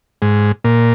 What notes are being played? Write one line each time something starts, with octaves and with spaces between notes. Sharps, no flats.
G#2
A#2